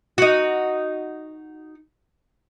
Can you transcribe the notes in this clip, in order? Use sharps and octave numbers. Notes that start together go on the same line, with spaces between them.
D#4 F#4